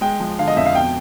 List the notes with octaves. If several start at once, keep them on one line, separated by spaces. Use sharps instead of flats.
G#3 G5
F3
D3 F5
D#5
F2 E5
F5
B2 G5